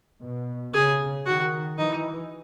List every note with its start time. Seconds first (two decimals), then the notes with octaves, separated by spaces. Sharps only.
0.22 B2
0.74 C#3 G#4
1.26 D#3 F#4
1.77 E3 D#4